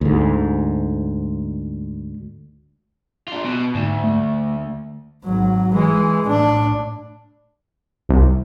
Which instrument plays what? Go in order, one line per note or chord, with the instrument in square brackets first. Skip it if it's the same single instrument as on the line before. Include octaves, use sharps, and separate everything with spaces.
[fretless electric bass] D2 G#2
[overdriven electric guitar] D4 F4
B2
[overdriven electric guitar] D2 [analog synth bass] G#2
[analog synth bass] A3
[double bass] G#1 F#3
E3 G#3
A2 D4
[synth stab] C2